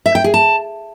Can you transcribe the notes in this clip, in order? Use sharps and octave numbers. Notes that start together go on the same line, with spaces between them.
E5
G5
G#4
A5